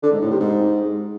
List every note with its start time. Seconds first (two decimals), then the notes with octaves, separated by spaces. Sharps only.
0.03 D3
0.12 G#2
0.21 A2
0.31 C3
0.40 G#2